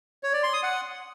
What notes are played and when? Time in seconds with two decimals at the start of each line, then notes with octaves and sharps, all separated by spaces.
0.23 C#5
0.33 D5
0.43 C6
0.53 D#6
0.63 F#5